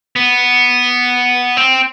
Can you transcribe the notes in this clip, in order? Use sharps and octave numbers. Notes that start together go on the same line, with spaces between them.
B3
C4